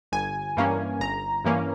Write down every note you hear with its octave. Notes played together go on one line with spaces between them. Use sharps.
G1 G#5
G2 E3 A#3 C#4
G1 A#5
G2 E3 A#3 C#4